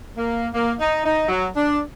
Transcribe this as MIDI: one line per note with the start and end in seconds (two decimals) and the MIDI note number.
0.16 0.48 58
0.55 0.74 58
0.80 1.01 63
1.05 1.28 63
1.29 1.47 54
1.55 1.78 62